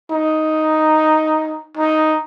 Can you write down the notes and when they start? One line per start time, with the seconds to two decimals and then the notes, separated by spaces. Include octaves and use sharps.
0.11 D#4
1.77 D#4